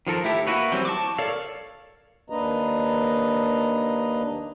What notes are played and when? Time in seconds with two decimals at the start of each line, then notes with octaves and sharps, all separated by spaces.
0.07 D#3 F3 A4 A#4
0.24 A3 E4 G4
0.47 A#3 E4 F#4 B4 C#5
0.72 E3 F#3 G3 C4
0.85 A5 C#6 D6
1.18 A4 A#4 C#5 D5 F5
2.30 D#2 A#3 D4 B4 D#5 A#5